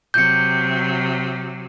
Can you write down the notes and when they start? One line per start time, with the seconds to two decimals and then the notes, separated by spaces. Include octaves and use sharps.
0.14 C3 F#3 G6 C#7